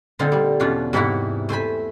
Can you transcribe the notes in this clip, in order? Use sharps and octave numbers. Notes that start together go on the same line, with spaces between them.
A#2 D3 C4 D#4 A4 F5
G3 F5
E2 B2 C#4 D4 F4
G#2 C3 E3 A#3 E4 F#4
A3 C5 G#5 B5